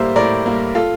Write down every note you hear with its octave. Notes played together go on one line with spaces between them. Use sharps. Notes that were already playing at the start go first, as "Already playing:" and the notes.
Already playing: A2 G3 A#3 C5 E5
A2 A#4 D5
G3 A#3
F4 A4